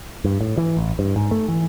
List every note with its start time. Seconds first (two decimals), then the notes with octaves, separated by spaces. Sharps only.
0.25 G2
0.41 A2
0.58 E3
0.77 A1
0.99 G2
1.16 G#2
1.31 A3
1.48 E3